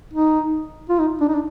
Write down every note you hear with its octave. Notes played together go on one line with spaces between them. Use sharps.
D#4
F4
D#4
D4
D#4
D4